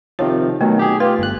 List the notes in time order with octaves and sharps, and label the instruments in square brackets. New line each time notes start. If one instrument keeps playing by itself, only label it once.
[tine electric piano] C3 D#3 F3 [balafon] C#5
[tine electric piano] B2 D#3 F#3 [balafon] A3
[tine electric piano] G4 G#4
[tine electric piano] F4 G4 [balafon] B4
[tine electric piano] G1 F#6